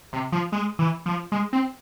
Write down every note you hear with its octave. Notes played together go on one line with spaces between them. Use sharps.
C3
F3
G#3
E3
F3
G#3
C4